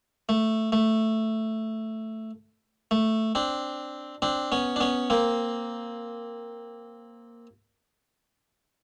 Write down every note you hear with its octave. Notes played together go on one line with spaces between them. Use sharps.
A3
A3
A3
C4 D4
C4 D4
B3 C#4
D4
B3 C#4
A#3 C4